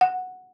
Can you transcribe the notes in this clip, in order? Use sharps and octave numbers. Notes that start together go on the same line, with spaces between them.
F#5